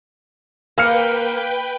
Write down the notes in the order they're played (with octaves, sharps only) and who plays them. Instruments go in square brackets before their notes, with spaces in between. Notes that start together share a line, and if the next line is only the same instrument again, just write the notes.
[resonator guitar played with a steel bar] A#3 [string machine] B4 G5 [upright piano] F5 F6 C#7